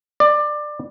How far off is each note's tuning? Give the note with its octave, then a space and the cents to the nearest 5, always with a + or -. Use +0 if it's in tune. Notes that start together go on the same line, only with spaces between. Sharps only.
D5 +20